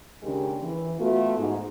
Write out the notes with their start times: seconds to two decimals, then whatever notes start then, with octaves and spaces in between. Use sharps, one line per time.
0.23 D#2 C#3 G#3 D4 G4
0.62 E3
0.99 A3 B3 F4 F#4
1.38 G#2